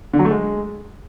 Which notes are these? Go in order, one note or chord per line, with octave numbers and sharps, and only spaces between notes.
D3
F#3
A3
G#3